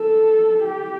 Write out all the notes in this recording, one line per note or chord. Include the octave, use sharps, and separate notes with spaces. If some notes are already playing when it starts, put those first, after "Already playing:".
Already playing: A4
G4